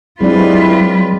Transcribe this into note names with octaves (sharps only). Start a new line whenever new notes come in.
G2 F#3 G#3 C4 E4 F4 B4 D5